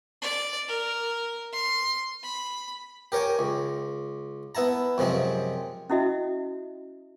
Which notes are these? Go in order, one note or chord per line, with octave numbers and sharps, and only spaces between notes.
D5
A#4
C6
B5
G4 A#4 C#5 G5 G#5
C#2
B3 E4 A5 A#5
F#2 C3 F3 G#3
C#4 E4 F#4 D#5 E5